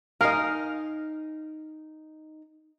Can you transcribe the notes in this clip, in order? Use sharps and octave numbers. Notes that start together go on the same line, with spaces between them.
D#4 A#4 D#5 F5 G#5